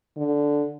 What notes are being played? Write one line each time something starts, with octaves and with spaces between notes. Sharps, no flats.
D3